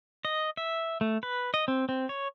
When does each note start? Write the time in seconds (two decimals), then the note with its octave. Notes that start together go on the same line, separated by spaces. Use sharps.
0.25 D#5
0.57 E5
1.01 A3
1.23 B4
1.54 D#5
1.68 C4
1.89 C4
2.09 C#5